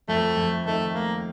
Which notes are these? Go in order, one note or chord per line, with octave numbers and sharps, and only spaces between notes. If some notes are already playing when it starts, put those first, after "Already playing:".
F2 A3
F2
D#3 A3
A3 A#3